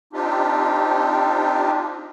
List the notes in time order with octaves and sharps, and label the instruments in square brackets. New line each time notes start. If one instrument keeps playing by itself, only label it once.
[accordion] C4 D4 D#4 F4 G4